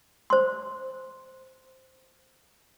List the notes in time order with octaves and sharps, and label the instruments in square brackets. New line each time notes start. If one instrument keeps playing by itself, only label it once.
[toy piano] C5 C6